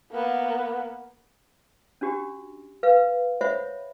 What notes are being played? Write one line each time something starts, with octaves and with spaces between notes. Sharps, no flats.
A#3 B3
C#4 D4 F#4 G4
B4 F5
C5 C#5 E5 F#5 B5